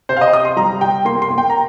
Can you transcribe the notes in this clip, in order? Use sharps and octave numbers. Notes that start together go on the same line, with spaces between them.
C3 C5
F5
D#5
C3 D#6
C6
G3 A#5
C3 G5
A#3 C6
C6
A#3
G5
A#5